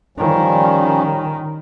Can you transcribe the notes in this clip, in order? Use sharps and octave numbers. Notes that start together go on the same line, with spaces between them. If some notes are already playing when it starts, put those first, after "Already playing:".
D#3 F3 G3 C#4